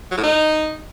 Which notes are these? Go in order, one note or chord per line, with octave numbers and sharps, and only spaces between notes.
F#3
A2
D#4